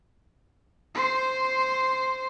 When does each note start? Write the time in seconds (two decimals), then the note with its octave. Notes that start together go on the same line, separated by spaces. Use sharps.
0.95 C5 C6